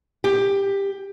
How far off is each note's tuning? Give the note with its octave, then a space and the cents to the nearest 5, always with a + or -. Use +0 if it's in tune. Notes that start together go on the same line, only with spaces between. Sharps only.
G4 +15